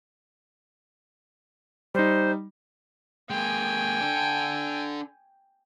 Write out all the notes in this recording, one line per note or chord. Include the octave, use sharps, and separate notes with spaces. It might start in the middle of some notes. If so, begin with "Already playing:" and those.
G3 D#4 C5
G#3 A#3 G5 G#5
D4 A4